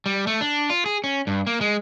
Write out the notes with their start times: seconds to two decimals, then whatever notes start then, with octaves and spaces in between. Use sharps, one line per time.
0.06 G3
0.27 A3
0.41 D4
0.70 F4
0.86 G#4
1.04 C#4
1.27 G2
1.47 A#3
1.61 G#3